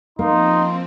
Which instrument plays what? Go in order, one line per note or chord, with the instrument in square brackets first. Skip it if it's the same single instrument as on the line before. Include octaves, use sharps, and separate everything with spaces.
[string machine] F3 C4 [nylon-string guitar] A#3 [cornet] D#4 [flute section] C6